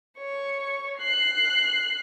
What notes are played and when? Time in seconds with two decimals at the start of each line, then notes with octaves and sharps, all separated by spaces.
0.18 C#5 C#6
0.99 F#6 C7